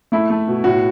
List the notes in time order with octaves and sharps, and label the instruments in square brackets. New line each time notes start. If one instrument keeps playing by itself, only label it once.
[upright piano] A3 E4
A3
B2
A2 F#4